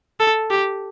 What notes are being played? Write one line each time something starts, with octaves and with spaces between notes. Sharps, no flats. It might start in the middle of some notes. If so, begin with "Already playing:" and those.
A4
G4